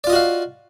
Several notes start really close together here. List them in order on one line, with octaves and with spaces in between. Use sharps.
D5 F4 D#5 F#4 F5